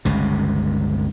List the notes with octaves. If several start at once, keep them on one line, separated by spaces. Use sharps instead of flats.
G1 C#2 C3